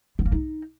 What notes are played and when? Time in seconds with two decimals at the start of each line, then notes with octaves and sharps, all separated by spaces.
0.19 B3
0.25 A#3
0.32 D#4